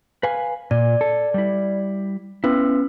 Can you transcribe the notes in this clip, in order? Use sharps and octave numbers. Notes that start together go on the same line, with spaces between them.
B4 F5 G#5
A#2 D5
A4
G3 E4
B3 C#4 E4 B4